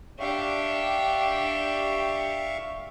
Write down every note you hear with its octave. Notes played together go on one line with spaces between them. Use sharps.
D4 G4 E5 F5 C#6